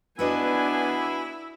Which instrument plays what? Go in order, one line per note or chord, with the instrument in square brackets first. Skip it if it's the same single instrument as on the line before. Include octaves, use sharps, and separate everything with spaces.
[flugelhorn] B3 [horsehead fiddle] D4 G#5 [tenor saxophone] E4 [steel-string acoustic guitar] F#4 B4 D#5